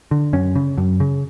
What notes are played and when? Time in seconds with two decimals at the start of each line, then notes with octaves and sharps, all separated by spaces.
0.11 D3
0.33 F#2 C#4
0.55 C#3
0.77 F#2
1.00 C#3